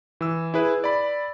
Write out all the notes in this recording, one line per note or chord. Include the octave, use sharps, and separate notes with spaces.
E3 E6
E4 G#4 B4
D5 B5